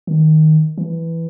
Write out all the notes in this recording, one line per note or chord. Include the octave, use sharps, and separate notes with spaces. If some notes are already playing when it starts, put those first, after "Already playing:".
D#3
E3